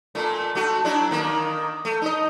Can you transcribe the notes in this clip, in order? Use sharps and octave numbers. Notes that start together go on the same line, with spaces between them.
A#2 A3
A3 F#4
F#3 D4 E4
D#3 A#3
A3
D#4 D#5